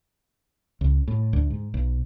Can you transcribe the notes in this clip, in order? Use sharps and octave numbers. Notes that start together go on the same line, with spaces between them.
C#2
A2
D2
G#2
B1